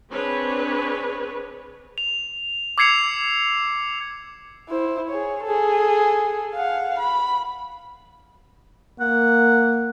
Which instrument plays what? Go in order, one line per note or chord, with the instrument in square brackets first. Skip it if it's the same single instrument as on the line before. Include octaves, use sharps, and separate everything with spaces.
[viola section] C4 D4 G#4 B4 C#5
[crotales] F7
D6 E6 G#6 C7 C#7 F7
[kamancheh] E4 C5
G#4 C#5
G#4 A4
F5 F#5
B5
[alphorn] A#3 [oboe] F#5